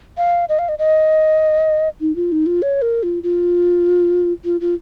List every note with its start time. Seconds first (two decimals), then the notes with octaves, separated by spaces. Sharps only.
0.18 F5
0.49 D#5
0.59 F5
0.69 D#5
0.79 D#5
2.01 D#4
2.16 F4
2.32 D#4
2.46 F4
2.62 C#5
2.82 A#4
3.03 F4
3.23 F4
4.45 F4
4.61 F4